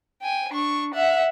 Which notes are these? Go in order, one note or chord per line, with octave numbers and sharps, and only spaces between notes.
G5 G#5
D4 C#6
E5 F#5